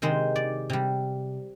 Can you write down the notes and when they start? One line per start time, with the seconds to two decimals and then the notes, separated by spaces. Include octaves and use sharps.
0.02 C3 D#3 G#3 C5
0.36 D5
0.70 C3 G3